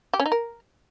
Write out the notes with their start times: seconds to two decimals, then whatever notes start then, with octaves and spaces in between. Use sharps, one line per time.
0.13 G4
0.20 C#4
0.26 D#4
0.32 A#4